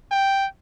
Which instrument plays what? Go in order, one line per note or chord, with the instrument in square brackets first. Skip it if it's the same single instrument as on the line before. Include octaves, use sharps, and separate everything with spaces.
[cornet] G5